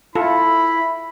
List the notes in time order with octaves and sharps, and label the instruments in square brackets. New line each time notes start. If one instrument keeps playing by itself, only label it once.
[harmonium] E4 [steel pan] F4 A4 [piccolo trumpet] B5